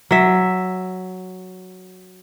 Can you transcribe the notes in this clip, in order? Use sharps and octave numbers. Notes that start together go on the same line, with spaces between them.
F#3 E5